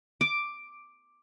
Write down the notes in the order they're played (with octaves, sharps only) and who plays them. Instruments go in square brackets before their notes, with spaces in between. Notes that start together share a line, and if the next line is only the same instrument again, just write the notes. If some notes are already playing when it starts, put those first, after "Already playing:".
[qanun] D6